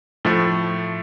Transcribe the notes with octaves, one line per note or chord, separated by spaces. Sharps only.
A2 F3 A3